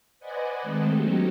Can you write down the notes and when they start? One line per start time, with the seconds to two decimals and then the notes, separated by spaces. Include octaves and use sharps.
0.20 B4 C5 D5 D#5 F#5 G#5
0.62 D#3 G#3 A3 C4 A4 C5
0.95 F#3 B3 C#4 D#4 F#4 G4